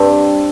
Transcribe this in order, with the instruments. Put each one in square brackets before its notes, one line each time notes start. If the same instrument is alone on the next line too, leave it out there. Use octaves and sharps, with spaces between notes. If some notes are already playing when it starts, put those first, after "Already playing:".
Already playing: [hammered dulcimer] G2 C4